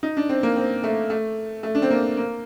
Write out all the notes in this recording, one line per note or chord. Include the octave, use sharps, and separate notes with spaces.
D#4
D4
C4
A#3
C4
A3
A3
A3
D4
C4
A#3
A#3